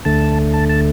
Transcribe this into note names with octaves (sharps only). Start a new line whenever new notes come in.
D2 D3 A3 A5
A5
A5